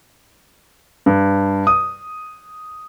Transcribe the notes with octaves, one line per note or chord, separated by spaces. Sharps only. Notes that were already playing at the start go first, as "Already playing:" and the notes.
G2
D#6